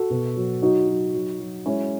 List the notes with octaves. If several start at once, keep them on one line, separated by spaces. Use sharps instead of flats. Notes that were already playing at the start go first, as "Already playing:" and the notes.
Already playing: F#4 A4
B2
F#3
F#3 D#4 F#4
F#3
F#3
F#3
G#3 C#4 E4